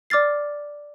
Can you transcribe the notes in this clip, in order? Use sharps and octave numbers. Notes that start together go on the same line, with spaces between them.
D5 D6 F6 A6 C7